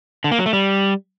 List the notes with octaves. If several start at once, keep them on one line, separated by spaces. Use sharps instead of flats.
D3
A#3
F#3
A3
G3